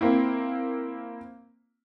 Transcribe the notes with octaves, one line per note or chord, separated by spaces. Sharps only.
A#3 C4 E4